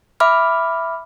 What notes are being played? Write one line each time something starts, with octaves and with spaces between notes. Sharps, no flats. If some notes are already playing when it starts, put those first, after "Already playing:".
E5 B5 D6 F6